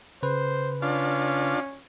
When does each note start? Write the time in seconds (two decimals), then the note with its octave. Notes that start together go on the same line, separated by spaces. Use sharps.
0.23 C#3 B4 C5
0.82 C#4 D4 F4